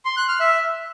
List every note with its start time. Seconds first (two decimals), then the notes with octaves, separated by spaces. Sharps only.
0.05 C6
0.17 F#6
0.28 F6
0.40 E5